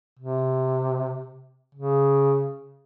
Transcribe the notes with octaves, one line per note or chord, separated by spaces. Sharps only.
C3
C#3